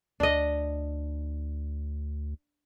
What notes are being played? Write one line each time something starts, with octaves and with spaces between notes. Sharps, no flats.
D2 D4 D#5